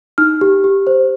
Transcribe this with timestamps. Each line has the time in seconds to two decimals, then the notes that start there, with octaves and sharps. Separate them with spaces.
0.18 D#4 F6
0.41 G4
0.64 G4
0.87 C5